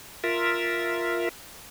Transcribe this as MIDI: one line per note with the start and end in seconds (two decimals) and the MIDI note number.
0.24 1.29 65
0.24 1.29 70
0.24 1.29 76